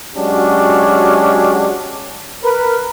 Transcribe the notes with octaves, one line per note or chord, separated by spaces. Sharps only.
F#3 G#3 C#4 D4 F#4 G4
A#4 B4